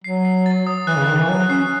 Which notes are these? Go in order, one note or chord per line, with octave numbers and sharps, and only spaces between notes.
F#3 C7
C7
A6
D#6
E3 F#6
C#3
D#3 F#6
E3
F#3 F#6
C#4 C7